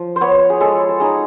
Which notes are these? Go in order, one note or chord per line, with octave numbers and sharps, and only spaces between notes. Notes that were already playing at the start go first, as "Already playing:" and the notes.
Already playing: F3
C5
B3 C#5
G#4
G#3 A4
A4
D#4 G#4